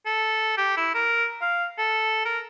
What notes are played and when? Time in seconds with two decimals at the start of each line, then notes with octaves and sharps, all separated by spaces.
0.06 A4
0.58 G4
0.77 E4
0.95 A#4
1.41 F5
1.78 A4
2.25 A#4